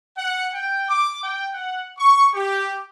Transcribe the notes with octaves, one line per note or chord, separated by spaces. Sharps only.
F#5
G5
D6
G5
F#5
C#6
G4